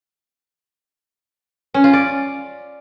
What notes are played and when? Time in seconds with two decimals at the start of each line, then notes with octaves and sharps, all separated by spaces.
1.74 C#4
1.84 F4
1.93 D5